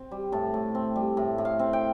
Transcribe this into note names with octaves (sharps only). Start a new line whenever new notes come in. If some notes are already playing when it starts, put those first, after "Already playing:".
Already playing: C4
G3
A2 A5
A2
C4
G3
A2
A2
F5
C4
G5